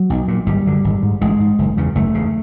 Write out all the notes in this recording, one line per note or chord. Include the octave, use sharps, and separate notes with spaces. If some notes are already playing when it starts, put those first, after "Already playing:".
Already playing: F#3
B1
A#2
G#1 G3
F#2 D3
G#1
G#2
A1 G#3
G#2
F#1
E2 C#3
F#1 A3
E2 C#3